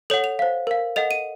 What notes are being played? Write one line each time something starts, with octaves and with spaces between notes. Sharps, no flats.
A4 C#5 F#5 F#7
F7
C5 F5
A#4 F5
A4 D#5 F#5 F7
D#7